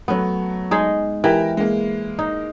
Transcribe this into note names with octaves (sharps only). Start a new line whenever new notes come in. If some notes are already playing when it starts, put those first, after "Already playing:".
F#3 A3 B3
G#3 D#4
E3 G4 A#4 G5
G#3 A#3
D#4